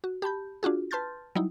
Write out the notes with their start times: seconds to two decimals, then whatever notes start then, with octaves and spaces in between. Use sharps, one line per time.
0.04 F#4
0.22 G4 A5 B5 G6
0.63 D4 F4 F#4 G#4
0.91 B4 A5 C6 F6 G6 A6
1.35 F#3 G3 D#4 E4